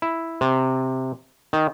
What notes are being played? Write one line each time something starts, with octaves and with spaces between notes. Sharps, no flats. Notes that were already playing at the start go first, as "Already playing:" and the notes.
E4
C3
D#3